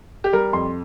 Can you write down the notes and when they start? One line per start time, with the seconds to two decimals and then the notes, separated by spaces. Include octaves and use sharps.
0.24 G4
0.33 G3 A#4
0.53 F2 C6